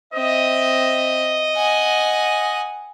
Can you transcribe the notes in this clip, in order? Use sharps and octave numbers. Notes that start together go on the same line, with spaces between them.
C4 D#5 E5
F#5 G#5